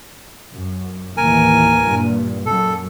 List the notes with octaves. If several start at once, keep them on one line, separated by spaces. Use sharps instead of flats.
F#2
D#2 A2 E3 A#4 G#5
G2 A#2
F#2 A4